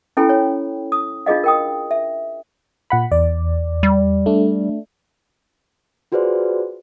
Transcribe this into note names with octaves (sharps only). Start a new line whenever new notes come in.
C#4 E4 A4 G5 G#5 B5
C#5
D#6
D4 F4 G#4 D#5 F5
A#4 G5 D#6
E5
A#2 F#5 B5
E2 D5
G3
A3 D4
F4 F#4 G#4 B4 C5 D5